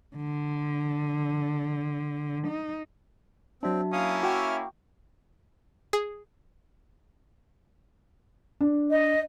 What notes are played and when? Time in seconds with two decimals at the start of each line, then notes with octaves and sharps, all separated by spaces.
0.16 D3
2.47 D#4
3.63 F#3 C4 D4 F#4 E5 A5
3.92 A#3 C#4 E4 F5 D#6
4.23 F#4 E5 G5 C#6 D6 F6
5.93 G#4
8.61 D4
8.90 D#5